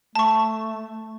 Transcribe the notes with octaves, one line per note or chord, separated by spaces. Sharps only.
A3 A5 C#6